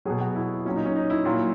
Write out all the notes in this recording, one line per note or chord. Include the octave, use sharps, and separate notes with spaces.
B2 F#3 G#4
F#4
E4
A#2 F#3 C#4
D#4
C#4
D#4
E4
A#2 F#3